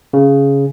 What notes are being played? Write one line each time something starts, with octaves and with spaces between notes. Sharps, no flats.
C#3